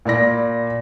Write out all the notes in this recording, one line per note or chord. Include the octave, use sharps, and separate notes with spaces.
A#2 D5 B5 A#6